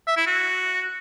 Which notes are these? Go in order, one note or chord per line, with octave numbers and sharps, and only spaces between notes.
E5
E4
F#4